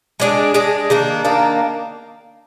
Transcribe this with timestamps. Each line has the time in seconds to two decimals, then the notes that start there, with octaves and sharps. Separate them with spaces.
0.20 G#3 D4 G#4
0.54 G#3 D4 G#4
0.90 D#3 A#3 D4
1.25 D#3 A#3 D4